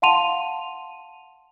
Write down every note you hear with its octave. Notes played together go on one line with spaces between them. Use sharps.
F5 F#5 A5 C6 D#7 F7